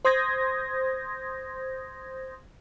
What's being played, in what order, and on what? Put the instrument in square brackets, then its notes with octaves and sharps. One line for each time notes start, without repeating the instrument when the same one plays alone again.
[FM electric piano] C5 C6 D#6 G6 G#6 A#6